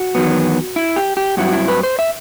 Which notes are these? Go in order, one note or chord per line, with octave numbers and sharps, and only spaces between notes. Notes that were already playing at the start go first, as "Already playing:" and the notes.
Already playing: F#4
E2 D#3 F#3 B3
E4
G4
G4
G2 F#3 C4 E4 F#4
E4
B4
C5
E5